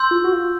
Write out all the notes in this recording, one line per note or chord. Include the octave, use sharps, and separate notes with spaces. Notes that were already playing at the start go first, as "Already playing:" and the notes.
Already playing: C6 E6 G6
F4
F#4
F4